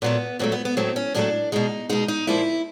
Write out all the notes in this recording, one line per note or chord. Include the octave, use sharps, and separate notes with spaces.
A#2 F#3 A3 B3
A#2 F#3 A3 B3
B3
B3
A2 F#3 A3 C4
C#4
A2 F#3 A3 D4
B2 G#3 D#4
B2 G#3 D#4
D#4
A#2 F3 A#3 E4